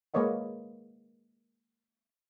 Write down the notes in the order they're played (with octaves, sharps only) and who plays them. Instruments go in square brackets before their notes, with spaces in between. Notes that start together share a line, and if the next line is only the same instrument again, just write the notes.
[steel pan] G#3 A#3 B4 C#5 D#5 F#5